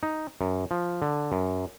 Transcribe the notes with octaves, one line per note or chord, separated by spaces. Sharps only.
D#4
F#2
F3
D3
F#2